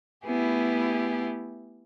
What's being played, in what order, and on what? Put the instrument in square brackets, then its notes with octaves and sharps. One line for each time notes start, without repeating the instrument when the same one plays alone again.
[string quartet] A3 B3 E4 G4 G#4